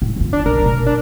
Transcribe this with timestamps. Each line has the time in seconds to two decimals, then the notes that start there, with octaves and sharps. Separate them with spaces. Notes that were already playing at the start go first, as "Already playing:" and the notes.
0.02 A2
0.16 D#3 F4
0.33 D4
0.46 B1 A#4
0.62 B2 A3
0.86 D4